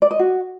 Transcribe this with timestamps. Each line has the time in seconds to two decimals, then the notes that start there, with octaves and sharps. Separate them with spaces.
0.02 D5
0.11 D#5
0.19 F#4